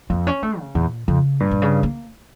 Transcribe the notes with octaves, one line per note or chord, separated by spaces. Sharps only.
F2 A#3
C#4
A3
C#3
E2 A#2
F2 C#3
G2 A#2
A#2
C#3
A#3